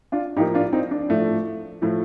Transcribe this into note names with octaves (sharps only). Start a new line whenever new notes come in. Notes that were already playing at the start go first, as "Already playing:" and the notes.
D4 F4
A2 F3 A#3 D#4 G4
D4 F4
C4 D#4
D4
A2 F3 A3
A2 F3 A3